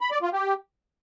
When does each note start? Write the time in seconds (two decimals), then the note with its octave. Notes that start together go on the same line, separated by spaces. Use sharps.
0.01 B5
0.11 D5
0.22 F4
0.33 G4